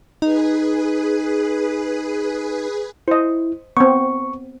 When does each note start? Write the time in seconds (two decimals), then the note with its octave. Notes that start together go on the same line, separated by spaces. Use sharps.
0.22 D#4 G#4 B4
3.08 E4 C5 D#5
3.77 B3 C4 C#6